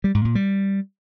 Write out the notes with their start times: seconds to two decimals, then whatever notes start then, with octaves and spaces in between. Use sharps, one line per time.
0.04 G3
0.15 G#2
0.25 A#2
0.35 G3